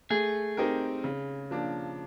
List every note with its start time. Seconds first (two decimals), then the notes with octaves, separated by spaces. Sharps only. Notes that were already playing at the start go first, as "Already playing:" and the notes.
0.10 A3 G#4
0.57 C4 D#4 G4 A#4
1.04 C#3
1.51 F3 A#3 D4